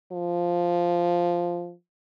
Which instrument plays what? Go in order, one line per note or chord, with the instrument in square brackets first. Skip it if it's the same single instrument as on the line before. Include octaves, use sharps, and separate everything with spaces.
[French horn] F3